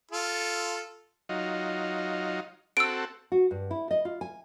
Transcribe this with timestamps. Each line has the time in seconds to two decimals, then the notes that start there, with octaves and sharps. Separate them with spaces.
0.11 F4 A4
1.29 F#3 D#4 F4
2.77 C4 F#4 A4 E6 D7
3.32 F#4
3.51 G2
3.71 E4
3.91 D#5
4.05 F4
4.21 G#5